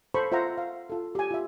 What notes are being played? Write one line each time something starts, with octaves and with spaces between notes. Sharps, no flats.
A4 C5 B5 C#6
F4 C5 E5 F#5 A#5
F5
F4 A4
G4 G#5
F4 E5